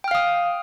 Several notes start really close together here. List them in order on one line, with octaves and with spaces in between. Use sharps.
G5 F6 F5 D#6